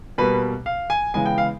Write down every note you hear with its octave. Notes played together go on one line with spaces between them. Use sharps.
B2 G3 A#3 B4
F5
G#5
C#3 E3 G#3 B3 G#5
G5
F5